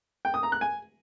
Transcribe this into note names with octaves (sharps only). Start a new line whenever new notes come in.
G5
D#6
A#5
F#6
G#5